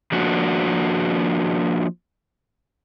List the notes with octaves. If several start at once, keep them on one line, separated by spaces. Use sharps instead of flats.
F3 A#3 D4 F#4